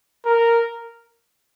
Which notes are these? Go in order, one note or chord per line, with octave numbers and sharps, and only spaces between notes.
A#4